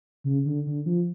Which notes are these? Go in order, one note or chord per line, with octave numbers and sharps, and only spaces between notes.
C#3
D3
D3
F3